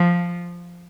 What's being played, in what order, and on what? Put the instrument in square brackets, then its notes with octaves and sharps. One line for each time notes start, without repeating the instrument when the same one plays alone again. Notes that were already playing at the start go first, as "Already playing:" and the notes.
Already playing: [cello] F3